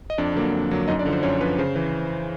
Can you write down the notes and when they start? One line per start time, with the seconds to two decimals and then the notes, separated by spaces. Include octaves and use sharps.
0.10 D#5
0.18 F2 D4 D5
0.35 D3 F#3 A#3
0.54 F2
0.71 D3 F#3 A#3
0.88 F#2 D#4 D#5
0.99 D4 D5
1.05 D3 F3
1.13 C5
1.23 F#2 C#4 C#5
1.41 D3 F3 B4
1.58 C#3 C5
1.75 E3